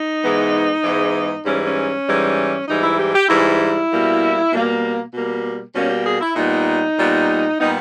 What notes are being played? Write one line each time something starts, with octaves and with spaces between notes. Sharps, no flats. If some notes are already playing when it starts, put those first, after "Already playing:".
Already playing: D#4
G#2 E3 G#3 B3
G#2 E3 G#3 B3
G#2 E3 G3 C#4
C#4
G#2 E3 G3
G#2 E3 G3 D#4
E4
G4
G4
G#2 E3 G3 E4
B2 G3 A#3
B2 G3 A#3
B2 G3 A#3
B2 G3 A#3 C#4
G4
G#4
E4
A#2 G3 B3 D#4
A#2 G3 B3
A#2 G3 B3 D#4